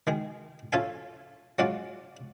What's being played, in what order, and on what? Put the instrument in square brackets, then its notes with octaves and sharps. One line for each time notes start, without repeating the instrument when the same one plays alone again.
[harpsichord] D#3 G#3 G#4
C#4 F4 A4 E5 F5 G#5
F#3 G#3 C#4 F4 D5 F#5